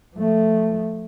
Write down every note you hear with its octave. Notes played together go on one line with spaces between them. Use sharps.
F3 A3